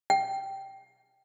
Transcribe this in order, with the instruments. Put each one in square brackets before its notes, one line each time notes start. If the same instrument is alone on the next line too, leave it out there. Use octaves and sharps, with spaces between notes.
[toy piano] G5